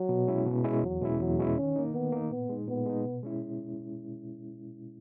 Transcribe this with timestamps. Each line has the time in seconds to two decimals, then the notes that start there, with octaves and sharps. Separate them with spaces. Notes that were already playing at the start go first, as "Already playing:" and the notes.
Already playing: F#3
0.09 B2
0.27 G#3 C#4 E4
0.46 B2
0.64 G#3 C#4 E4
0.83 E2 F#3
1.02 B2 G#3 C#4 E4
1.19 E2 F#3
1.38 B2 G#3 C#4 E4
1.57 D#3 C#4
1.76 A#3 D#4
1.94 D#3 B3
2.12 A#3 D#4
2.31 A#2 B3
2.49 G#3 D#4
2.68 A#2 B3
2.86 G#3 D#4
3.04 B2
3.23 G#3 C#4 E4